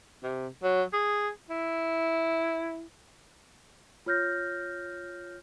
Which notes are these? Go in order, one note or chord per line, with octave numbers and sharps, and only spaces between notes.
C3
F#3
G#4
E4
F4 C#5 F6 G6 A#6